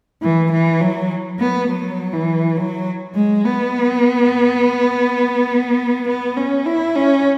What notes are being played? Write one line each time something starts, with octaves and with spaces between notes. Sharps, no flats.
E3
E3
F#3
B3
F#3
E3
F#3
G#3
B3
B3
C#4
E4
C#4